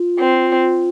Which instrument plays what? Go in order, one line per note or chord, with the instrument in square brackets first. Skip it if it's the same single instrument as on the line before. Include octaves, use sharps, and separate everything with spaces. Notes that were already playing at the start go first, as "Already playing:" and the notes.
Already playing: [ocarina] F4
[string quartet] C4